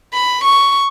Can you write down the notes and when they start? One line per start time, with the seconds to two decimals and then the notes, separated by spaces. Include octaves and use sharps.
0.14 B5
0.44 C#6